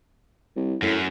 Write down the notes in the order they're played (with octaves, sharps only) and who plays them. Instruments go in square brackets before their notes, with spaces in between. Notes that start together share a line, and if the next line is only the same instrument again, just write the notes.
[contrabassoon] C2
[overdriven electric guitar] F#2 [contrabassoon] A2